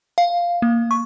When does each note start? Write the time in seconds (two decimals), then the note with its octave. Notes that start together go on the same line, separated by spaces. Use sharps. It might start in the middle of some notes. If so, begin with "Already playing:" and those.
0.18 F5
0.62 A#3
0.91 C#6